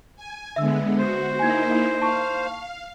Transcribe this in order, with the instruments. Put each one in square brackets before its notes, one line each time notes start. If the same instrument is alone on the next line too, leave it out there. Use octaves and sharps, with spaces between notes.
[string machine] G#5
[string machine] D3 G#3 B3 [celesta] E5 E6
[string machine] F#4 [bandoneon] C5
[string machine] A#3 D#4 E4 [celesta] G#5 G#6
[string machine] F5 [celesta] A5 C#6